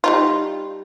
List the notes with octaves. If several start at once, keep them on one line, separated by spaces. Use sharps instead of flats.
G3 D#4 F4